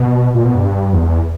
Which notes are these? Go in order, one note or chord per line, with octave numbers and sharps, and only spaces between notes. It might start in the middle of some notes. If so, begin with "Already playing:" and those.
Already playing: B2
A#2
B2
G2
E2